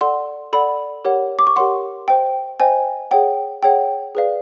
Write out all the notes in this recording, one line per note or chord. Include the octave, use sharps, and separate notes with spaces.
A4 D5 F#5 C6
A4 D5 F#5 B5
G4 A#4 C#5 F#5
D6
C#6
G4 A#4 C#5 F#5 C6
C5 D#5 G5
C5 D#5 G5 G#5
G#4 C#5 F#5 G5
G#4 C#5 F#5 G5
G#4 B4 D5 F5